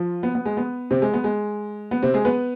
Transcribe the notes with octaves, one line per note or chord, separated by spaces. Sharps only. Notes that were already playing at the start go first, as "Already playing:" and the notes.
Already playing: F3 F4
B3
B3
G#3
B3
C3 C4
G#3
B3
G#3
B3
C3 C4
G#3 G#4
B3 B4